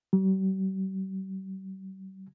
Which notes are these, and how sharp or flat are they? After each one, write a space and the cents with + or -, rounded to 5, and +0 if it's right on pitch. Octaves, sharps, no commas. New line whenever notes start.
G3 -45